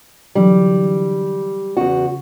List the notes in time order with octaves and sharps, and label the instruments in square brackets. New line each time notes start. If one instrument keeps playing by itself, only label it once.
[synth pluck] D3 E3 F#3 [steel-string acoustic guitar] G3
[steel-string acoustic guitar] E2 F#4 [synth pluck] C#3